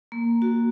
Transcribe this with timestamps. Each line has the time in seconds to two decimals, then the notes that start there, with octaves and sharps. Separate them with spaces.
0.12 A#3
0.42 F#4